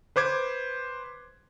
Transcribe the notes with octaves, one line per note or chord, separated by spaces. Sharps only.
B4 C5 D6 G#6